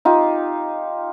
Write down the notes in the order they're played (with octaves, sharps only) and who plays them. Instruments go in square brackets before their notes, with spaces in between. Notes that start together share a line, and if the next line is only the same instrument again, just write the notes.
[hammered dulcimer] D#4 F4 G4